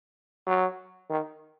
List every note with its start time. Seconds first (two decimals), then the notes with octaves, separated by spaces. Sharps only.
0.47 F#3
1.10 D#3